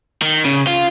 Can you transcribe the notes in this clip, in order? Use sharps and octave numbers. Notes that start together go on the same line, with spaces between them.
D#3
C#3
F4